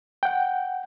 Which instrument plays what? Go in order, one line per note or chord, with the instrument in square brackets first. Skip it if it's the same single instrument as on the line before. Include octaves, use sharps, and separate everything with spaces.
[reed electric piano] F#5 G5